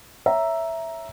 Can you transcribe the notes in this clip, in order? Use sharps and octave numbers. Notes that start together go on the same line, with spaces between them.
C#5 E5 A#5